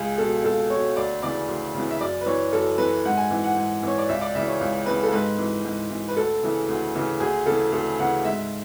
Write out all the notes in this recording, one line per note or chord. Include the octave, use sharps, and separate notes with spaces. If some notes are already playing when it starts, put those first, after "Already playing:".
Already playing: C#2 G#4
B2 A4
C#2 A4
B2 C#5
D2 D5
C#3 E3 D5
D2
C#3 E3
E5
F#2 D5
B4
E3 C#5
F#2 A4
E3 B4
G#2 F#5
G#5
E3
F#5
G#2
E3 C#5
D5
C#2 E5
D5
C#3 E3 E5
C#5
C#2
C#3 E3 B4
A4
G#2 B4
E3
G#2
E3
B4
D2 A4
C#3 E3
D2
C#3 E3
D2 G#4
C#3 E3 A4
D2 A4
C#3 E3 F#5
G#2 E5